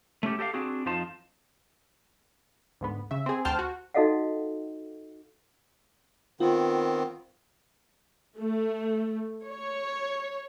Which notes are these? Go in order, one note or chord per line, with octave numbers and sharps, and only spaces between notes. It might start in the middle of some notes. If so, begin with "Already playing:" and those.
A3 C#4 G4 A4
G4 A4 E5 F5
C4 D4 F#4 G#4
F2 F3 D#4 F4 C5 A5
D2 G#2 B3
C#3 E5
C4 G#4
D2 C5 G5 A5 F6
F#4
D#4 F#4 A4 D#5 F5 F#5
D#3 B3 C4 F4
A3
C#5